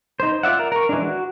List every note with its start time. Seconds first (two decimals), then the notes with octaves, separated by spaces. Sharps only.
0.20 D#4 C5
0.43 F4 D5 E5 F#5
0.59 A#4
0.72 A#4 C#6
0.89 E3 G#3 D4
1.03 F#4